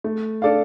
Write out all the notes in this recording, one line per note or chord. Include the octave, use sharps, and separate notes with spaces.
A3
D4 A4 D5 F5